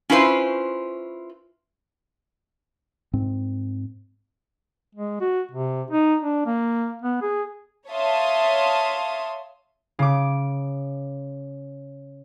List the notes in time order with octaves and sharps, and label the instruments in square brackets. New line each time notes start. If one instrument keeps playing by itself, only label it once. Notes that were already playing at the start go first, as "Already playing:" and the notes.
[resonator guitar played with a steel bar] C#4 E4 F4 B4 C5
[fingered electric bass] G#2 C4
[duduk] G#3
F#4
C3
D#4
D4
A#3
B3
G#4
[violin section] C#5 E5 F5 A5 C6 D#6
[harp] C#3 D6